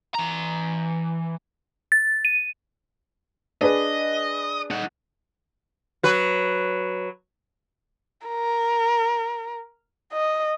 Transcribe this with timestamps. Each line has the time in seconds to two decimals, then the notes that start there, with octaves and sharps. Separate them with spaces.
0.15 E3 A#5
1.92 A6
2.25 D#7
3.61 D4 G#4 B4 D#5
4.71 D#4 F#5
6.03 F#3 B4
8.27 A#4
10.13 D#5